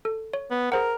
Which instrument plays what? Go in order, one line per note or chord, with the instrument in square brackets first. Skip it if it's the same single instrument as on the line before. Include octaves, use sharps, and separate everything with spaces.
[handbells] A4
C#5
[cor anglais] B3
[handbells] G#4 C5 F#5 [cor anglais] A#4